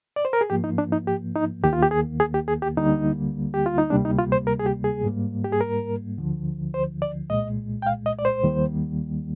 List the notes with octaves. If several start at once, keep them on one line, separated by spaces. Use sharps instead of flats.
D5
C5
A#4
G#4
G#2 F3 A#3 G4
D#4
D4
D#4
G4
D#4
D#2 D#3 A#3 G4
F4
G4
G#4
G#4
G4
G#4
G4
D2 D3 G3 A#3 D#4
G4
F4
D#4
D2 C3 G3 A#3 D4
D#4
F4
C5
A#4
G#4
G4
G#4
G#2 G3 A#3
G4
G#4
A#4
D2 D3 F3
C5
D5
C2 A#2 G#3 D#5
G5
F5
D#5
D5
C5
D#2 D#3 G3 A#3